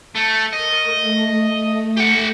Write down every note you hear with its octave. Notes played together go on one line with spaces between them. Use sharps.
A3
A#4 D#5 C#6
A3
G4 F#5